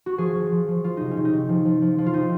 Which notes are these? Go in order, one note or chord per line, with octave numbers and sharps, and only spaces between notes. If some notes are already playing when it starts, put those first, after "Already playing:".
F#4
F3 G#4
F3
F3
F3
F3 F4
C3 D#4
C#4
C3
D#4
C3
F3
F3
F3
F3
F4
C3 D#4